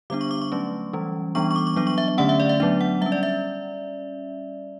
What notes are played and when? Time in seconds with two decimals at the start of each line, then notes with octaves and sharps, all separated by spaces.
0.10 D3 G3 B3 D4 D6
0.21 C#6
0.31 D6
0.42 C#6
0.52 F#3 A3 C#4
0.93 E3 G3 C#4
1.35 E3 G3 B3 D4 C#6
1.51 C#6
1.56 D6
1.67 C#6
1.76 F#3 B3 D4 D6
1.87 C#6
1.98 E5
2.08 E5
2.18 D3 A3 C#4 F#5
2.29 E5
2.40 D5
2.49 E5
2.60 F#3 B3 D4 E5
2.81 F#5
3.01 G3 E5
3.06 C#4
3.12 D5
3.23 E5